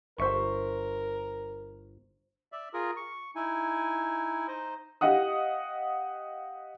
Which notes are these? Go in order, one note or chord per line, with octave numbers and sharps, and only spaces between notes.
G1 A#4 C5 E5 C#6
D5 E5
F4 G#4 A#4
C#6
D#4 E4 G#5
D#4 C5 D#5
G4 D#5 F5 F#5 D#6